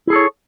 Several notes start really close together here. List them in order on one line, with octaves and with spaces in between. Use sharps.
E4 G#4 A4 C#5